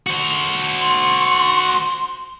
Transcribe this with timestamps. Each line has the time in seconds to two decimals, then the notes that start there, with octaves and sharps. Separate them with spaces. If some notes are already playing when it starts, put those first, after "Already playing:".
0.07 F#4 C5
0.81 C6